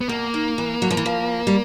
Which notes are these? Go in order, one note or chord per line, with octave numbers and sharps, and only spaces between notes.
B3
B2 A#3
D#3
E3
F#3
F3
E3
F3
G3